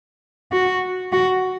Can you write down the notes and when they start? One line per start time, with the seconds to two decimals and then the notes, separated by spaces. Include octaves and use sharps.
0.52 F#4
1.13 F#4